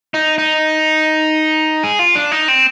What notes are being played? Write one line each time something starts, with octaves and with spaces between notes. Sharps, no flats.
D#4
D#4
G#4
F4
D4
D#4
C4